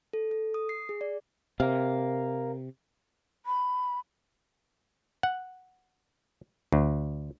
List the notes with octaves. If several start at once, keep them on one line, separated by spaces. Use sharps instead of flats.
A4
A4
D#6
C7
G#4
D5
C3 A#4 F5
B5
F#5
D2